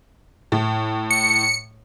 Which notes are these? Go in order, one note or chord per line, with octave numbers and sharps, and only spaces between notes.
A2
C#7